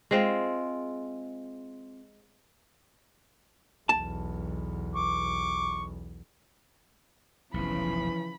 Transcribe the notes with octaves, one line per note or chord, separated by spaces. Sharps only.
G#3 C4 F4
B1 E2 A5
C#6 D6
F1 B1 C#3 E3 F3 B5